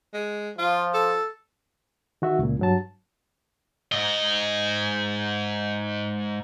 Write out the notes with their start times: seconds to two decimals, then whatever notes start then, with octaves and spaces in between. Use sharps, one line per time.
0.13 G#3
0.58 F3 F4
0.94 A4
2.22 D#3 F#4 E5
2.39 C#2 A#2
2.59 G2 F#3 A5
3.92 G#2 D#5